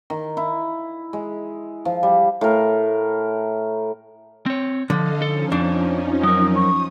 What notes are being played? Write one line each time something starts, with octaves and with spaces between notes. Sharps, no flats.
D#3
E4
G#3
F3
G3
A2 A#4
C4 C#5
D3 F3 A4 D#5 F5
F3 C#4 D#4 A4
F2 D4
F#3 A#4 D#6
C#6 D#6